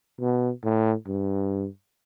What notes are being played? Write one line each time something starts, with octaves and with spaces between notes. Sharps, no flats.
B2
A2
G2